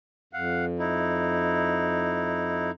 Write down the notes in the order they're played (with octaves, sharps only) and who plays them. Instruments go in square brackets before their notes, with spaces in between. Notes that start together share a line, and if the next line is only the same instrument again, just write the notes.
[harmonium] F2 [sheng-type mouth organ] F5 F#5
[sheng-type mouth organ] D#4 E4